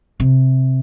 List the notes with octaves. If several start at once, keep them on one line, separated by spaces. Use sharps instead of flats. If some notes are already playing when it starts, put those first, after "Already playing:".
C3